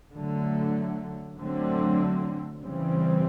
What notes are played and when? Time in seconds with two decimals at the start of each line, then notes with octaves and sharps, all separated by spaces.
0.15 D3 F#3 A3
1.38 D3 F#3 A3 C4
2.61 C#3 E3 G3 C4